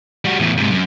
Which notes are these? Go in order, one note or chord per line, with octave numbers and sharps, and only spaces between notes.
G3 F#4
E2 A2
G#2 C3
F#2